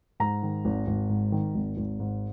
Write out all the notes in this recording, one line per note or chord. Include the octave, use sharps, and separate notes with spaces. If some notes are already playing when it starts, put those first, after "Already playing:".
G#2 A#5
D#3
G#1
G#1
G#2
D#3
G#1
G#1
G#2